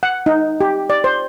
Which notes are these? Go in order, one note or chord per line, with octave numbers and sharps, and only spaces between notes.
F#5
D#4
G4
D5
C5